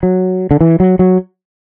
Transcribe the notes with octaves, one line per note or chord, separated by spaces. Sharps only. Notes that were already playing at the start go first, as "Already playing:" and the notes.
F#3
D3
E3
F#3
F#3